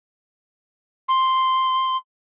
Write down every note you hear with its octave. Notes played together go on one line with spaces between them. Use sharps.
C6